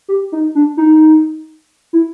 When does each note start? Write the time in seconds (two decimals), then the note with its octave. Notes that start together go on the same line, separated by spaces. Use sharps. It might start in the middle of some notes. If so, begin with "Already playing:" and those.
0.08 G4
0.32 D#4
0.55 D4
0.77 D#4
1.93 E4